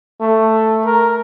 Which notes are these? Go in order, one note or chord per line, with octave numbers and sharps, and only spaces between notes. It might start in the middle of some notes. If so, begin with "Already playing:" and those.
A3
A#4